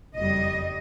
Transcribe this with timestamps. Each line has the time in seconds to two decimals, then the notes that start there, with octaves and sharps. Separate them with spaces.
0.15 F#1 F2 G3 D#5